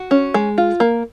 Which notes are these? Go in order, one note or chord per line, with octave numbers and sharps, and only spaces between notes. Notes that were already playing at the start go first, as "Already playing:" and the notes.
Already playing: F#4
C#4
G#3
F4
A#3